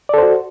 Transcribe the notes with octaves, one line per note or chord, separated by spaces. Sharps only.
F#4 A4 C5 D5